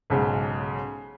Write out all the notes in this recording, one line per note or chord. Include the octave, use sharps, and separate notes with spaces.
B1 G#2 C#3